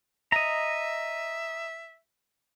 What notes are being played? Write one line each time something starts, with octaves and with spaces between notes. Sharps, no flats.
D#5 E5 A#5